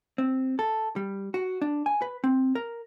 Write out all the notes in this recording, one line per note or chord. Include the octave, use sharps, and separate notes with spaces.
C4
A4
G3
F#4
D4
G#5
B4
C4
A#4